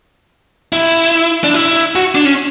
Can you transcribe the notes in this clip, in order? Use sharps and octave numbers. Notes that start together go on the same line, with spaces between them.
E4
D4
E4
F#4
D4
C#4